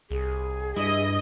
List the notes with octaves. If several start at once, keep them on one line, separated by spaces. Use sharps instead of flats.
C2 G#4
G2 E4 D#5